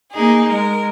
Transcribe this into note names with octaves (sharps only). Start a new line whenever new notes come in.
A#3 D#4 G#4
G#3 A#4